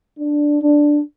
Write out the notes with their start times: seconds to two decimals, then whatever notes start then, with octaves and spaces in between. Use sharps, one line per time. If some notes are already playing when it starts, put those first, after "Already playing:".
0.19 D4
0.62 D4